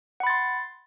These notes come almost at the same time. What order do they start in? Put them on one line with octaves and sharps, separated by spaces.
F#5 B5 A6 C6